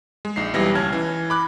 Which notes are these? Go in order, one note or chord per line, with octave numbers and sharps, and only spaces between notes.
G#3
A#1 D#4 C7
B1 E3 G3 A#6
C#2 C#4 A5 F6 G#6
E3
B5 D6 F#6